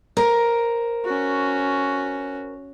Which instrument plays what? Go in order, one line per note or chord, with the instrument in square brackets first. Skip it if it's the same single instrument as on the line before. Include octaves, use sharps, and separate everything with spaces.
[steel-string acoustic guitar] A#4 C5
[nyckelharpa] C#4 F#4